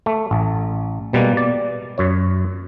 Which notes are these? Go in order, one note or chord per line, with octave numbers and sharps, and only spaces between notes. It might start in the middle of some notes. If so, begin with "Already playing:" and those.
A3
A1
B2 G3 G#3 A#3
D5
F#2 C#5